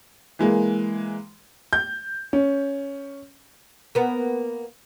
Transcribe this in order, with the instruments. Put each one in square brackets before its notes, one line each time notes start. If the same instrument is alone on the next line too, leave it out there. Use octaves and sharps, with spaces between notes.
[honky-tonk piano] E3 G#3 A#3
[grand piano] G6
C#4
[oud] A#3 B3